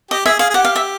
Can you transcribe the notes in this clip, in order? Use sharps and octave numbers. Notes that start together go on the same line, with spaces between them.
G4 D#5
G#4 E5
G#4 F5
G#4
G4 F#5
F5
E5